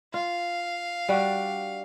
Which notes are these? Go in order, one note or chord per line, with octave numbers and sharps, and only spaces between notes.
F4 F5
G3 D4 F#4